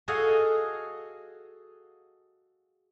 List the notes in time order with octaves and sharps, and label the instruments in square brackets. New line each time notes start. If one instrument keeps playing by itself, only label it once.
[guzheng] F#4 G#4 A4 D#5 F5 F#5